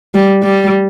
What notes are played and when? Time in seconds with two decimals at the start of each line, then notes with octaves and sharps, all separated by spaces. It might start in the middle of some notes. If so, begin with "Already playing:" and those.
0.14 G3
0.43 G3